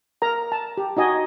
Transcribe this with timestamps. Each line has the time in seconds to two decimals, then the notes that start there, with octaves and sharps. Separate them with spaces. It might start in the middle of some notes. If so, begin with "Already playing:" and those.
0.22 A#4 A#5
0.52 A5
0.77 G4
0.97 D#4 F#4 D#5 G#5